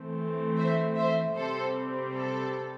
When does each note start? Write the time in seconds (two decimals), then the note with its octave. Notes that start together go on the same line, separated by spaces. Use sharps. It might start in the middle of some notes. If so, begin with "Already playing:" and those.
Already playing: E3 A3 C4
0.58 C5 E5
0.97 C5 E5
1.36 C3 G3 C4 A4 C5
2.15 A4